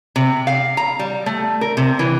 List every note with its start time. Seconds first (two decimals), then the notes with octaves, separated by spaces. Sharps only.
0.16 C3
0.47 F5
0.77 A#5
0.99 G3
1.26 A3
1.61 A#4
1.77 C3
1.99 E3